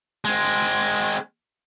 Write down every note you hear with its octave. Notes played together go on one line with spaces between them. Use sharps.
G#3 C4